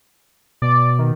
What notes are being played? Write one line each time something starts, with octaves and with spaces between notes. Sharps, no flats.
B2 D5
D#3